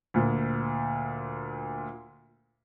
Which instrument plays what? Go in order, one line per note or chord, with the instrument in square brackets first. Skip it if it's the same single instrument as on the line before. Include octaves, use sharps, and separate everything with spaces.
[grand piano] D2 A#2